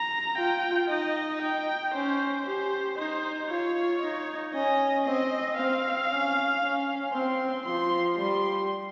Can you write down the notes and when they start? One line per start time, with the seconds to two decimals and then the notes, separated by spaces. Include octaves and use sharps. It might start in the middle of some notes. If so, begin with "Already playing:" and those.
Already playing: A#5
0.38 F4 G5
0.89 D#4 D#5
1.42 G5
1.94 C#4 C5
2.46 G4 C5
2.97 D#4 C5
3.50 F4 C#5
4.01 D#4
4.53 C#4 D#5
5.06 C4 D#5
5.57 C4 F5
6.10 C#4
6.62 C#4
7.13 C4 C6
7.66 F3 C6
8.17 G3 C6